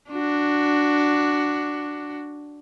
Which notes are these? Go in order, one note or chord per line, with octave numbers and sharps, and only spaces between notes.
D4 F#4